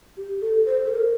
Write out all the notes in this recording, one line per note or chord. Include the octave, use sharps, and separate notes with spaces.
G4
A4
C5
A4
A#4